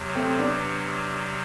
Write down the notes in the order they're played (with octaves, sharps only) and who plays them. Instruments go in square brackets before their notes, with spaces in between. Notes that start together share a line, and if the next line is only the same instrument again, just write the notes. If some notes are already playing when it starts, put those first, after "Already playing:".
Already playing: [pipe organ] E2 C3 F#3
[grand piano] A3 C4
B3 D4